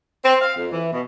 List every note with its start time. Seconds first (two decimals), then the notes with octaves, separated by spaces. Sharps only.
0.24 C4
0.41 F5
0.57 F2
0.72 E3
0.92 B2